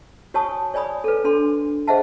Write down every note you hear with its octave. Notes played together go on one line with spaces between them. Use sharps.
F#4 C#5 G#5 A5 C#6 D#6
C#5 D5 G#5 B5 D#6
A4 B4
D4 A4 C6
G#4 C5 D#5 E5 F#5 A5